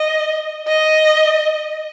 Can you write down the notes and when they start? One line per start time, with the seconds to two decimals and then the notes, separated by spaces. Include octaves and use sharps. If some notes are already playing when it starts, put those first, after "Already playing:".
Already playing: D#5
0.68 D#5